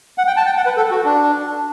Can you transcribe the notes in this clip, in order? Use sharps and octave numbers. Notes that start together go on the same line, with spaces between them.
F#5
G5
A5
G5
F#5
B4
A4
F#4
D4